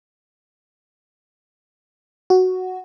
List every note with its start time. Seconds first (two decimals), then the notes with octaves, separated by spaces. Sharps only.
2.30 F#4